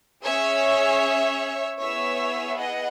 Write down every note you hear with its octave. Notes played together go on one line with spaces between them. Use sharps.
C#4 G#4 C#5 E5
B3 E4 G#4 C#5 E5
D#5 F#5